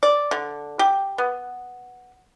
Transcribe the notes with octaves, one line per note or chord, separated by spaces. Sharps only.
D5
D3
G4
B3